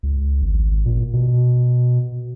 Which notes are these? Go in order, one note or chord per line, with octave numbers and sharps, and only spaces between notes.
C#2
G#1
A#2
B2